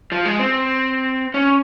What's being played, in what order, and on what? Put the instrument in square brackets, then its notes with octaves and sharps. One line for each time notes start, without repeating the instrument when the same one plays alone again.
[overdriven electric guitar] F3
G#3
C4
C#4